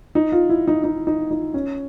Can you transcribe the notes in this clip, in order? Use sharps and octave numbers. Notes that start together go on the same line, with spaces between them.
D#4
F4
E4
D#4
D#4
D#4
D#4
C#4